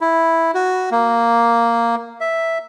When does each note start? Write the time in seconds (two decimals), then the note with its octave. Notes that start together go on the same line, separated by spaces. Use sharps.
0.01 E4
0.54 F#4
0.92 A#3
2.21 E5